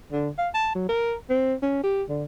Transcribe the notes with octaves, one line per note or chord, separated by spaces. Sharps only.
D3
F5
A5
F#3
A#4
C4
C#4
G4
D3